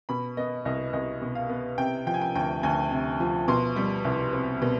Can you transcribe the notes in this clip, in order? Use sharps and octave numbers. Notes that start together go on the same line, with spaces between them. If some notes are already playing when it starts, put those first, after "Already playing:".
B2 B5
B3 D#5
C2 D#5
C2 D#5
B2
F5
B3
C3 G5
F3 G5
G#5
G5
D2 G5
D2 G#5
C3
F3
B2 C6
G3
C2
C4
B2